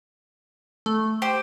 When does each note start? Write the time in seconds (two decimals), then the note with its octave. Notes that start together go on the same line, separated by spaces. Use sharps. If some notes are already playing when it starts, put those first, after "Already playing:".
0.86 A3
1.22 G4 C5